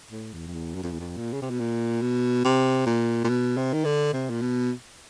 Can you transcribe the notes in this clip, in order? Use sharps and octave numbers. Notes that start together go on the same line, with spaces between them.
A2
E2
F2
E2
F#2
F2
E2
F2
A#2
C#3
C3
B2
A#2
B2
C3
A#2
A#2
B2
C3
D#3
D3
C3
A#2
B2